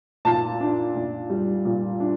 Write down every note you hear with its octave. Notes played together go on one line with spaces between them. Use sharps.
A#2 A5
D4
A#2
G3
A#2
D4